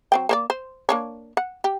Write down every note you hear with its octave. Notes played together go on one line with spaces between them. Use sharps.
F#3 C4 G5
A#3 C5 D5
C5
A#3 D4 C#5
F#5
G4